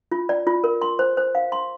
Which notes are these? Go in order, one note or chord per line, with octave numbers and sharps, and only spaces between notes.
F4
D5
F4
A#4
C6
C5
C5
F5
C6